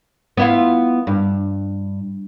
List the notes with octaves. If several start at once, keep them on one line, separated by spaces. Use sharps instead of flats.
B3 E4 F4
G2